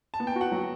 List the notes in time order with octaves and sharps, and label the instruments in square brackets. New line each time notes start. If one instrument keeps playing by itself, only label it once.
[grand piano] A5
[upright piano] B3
[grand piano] G5
[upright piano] F#4
[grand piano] F#5
[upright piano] F#3